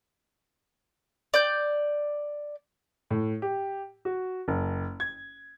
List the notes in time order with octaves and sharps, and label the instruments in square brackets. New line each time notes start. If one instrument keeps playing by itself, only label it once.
[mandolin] D5 G6
[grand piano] A2
G4
F#4
F#1
G#6